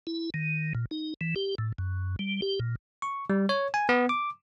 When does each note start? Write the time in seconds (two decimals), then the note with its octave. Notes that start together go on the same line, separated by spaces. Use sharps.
0.07 E4
0.34 D#3
0.75 A#2
0.91 D#4
1.21 E3
1.36 G4
1.58 A2
1.78 F#2
2.19 G3
2.42 G4
2.60 A#2
3.02 C#6
3.30 G3
3.49 C#5
3.74 G#5
3.89 B3
4.09 D6